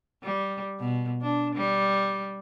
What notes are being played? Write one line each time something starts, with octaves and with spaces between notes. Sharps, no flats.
G3
B2
D4
G3